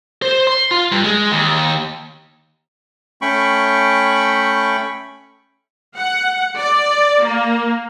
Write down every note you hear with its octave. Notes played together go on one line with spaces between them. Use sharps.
C5
C6
F4
G2
G#3
D#2
A3 C#4 G5 B5 C#6
F#5
D5
A#3